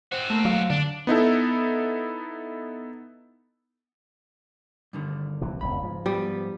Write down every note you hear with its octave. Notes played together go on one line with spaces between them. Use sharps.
C4 F#4 C5
A3 A#3
F#3 F5
D3 D4
B3 D#4 E4 A4
G2 D3 D#3
A#1 C3 E3
E1 C#2 C#3 B5
G#2 F3
G3 B3